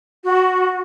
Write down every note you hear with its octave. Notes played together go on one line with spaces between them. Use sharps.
F#4